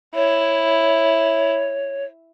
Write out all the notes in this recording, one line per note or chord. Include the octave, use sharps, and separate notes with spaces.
E4 C#5